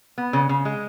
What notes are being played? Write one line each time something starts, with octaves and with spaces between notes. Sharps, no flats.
B3
C#3
C#3
G#3